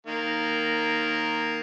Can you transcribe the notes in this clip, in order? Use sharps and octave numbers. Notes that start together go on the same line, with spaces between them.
D#3 A#3